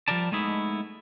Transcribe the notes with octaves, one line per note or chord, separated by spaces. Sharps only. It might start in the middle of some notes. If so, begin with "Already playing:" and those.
F3 G3 A#4 D5 A5
G#3 A3 B3 D#4 E4